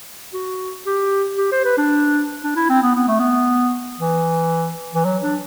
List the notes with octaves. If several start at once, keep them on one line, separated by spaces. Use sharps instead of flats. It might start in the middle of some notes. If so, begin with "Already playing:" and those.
F#4
G4
G4
C5
B4
D4
D4
E4
C4
B3
B3
A3
B3
E3
E3
F#3
D4